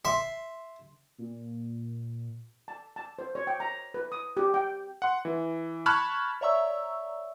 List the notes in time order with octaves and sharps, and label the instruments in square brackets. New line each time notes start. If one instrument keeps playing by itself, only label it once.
[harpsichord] E5 C6
[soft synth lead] A#2
[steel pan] A5
A5
C5
C#5
G5
A#5
B4
D#6
G4
G5
[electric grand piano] F#5 C6
E3
A5 B5 C#6 F6 F#6 G#6
[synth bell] C#5 D5 E5 A#5 C#6 E6